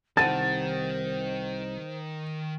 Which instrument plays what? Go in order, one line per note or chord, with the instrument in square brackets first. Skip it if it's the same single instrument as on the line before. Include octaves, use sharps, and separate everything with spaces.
[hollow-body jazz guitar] C2 F#5 A5 [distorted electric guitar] D#3 [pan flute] C5 [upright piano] A6